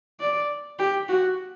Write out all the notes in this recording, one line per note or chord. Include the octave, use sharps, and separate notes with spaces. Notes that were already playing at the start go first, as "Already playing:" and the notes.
D5
G4
F#4